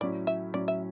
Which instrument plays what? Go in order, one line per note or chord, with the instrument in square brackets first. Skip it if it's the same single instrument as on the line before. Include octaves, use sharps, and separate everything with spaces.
[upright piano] A2 F#3 C#4 E4 [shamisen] D5
[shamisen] E5
[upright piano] A2 F#3 C#4 E4 [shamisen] D5
[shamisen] E5